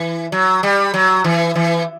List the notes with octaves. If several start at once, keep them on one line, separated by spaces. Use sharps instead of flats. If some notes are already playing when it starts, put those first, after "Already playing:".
Already playing: E3
F#3
G3
F#3
E3
E3